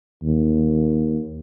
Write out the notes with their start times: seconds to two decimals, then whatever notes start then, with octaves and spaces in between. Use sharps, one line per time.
0.23 D#2